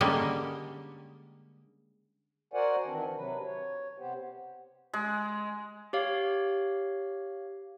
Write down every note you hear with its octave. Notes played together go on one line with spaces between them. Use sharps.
D3 G3 G#3 A#3 C#4
F#4 A#4 C5 D5 F#5 G#5
D#3 E3 C4 D4
C3 F#3 B4
C#5
C3 B3 G4 C5
G#3
G4 C#5 F5